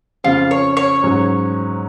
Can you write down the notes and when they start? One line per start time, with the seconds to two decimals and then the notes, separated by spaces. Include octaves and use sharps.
0.24 F2 C#3 F3 F4
0.51 C#5
0.77 C#5
1.03 G#2 F#3 C#4